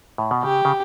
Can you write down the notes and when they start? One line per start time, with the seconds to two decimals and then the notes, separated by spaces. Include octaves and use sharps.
0.18 A2
0.31 B2
0.43 C#3 G4
0.65 C#3